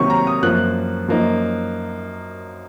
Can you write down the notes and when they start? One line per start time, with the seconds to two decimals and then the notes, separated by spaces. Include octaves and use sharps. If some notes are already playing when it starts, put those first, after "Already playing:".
Already playing: C3 D#3 F#3 A#3 C#6
0.10 A#5
0.27 D#6
0.43 F#2 F3 A#3 F#6
1.08 F#2 F3 A#3 D#4